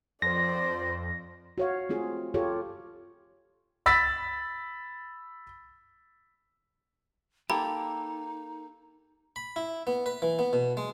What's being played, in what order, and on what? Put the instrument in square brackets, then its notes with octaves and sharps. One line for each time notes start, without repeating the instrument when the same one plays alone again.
[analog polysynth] F2 [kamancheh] C5 D5 [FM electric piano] A#6
[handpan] F#4 C#5 F5
A3 C4 F4 G#4
F4 G4 A4 C#5
[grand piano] B5 E6 A6 B6
[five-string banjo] A#3 A4 [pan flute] D#4 [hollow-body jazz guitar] G4 [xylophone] B5
[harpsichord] B5
E4
B3
B4
E3
B3
B2
G#3